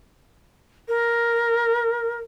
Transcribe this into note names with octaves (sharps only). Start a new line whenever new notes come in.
A#4